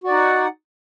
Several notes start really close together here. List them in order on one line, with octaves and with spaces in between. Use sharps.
F#4 D5 D#4 F#5